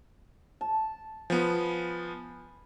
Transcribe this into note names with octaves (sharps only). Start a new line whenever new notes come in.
A5
F3 B3 G#5 B5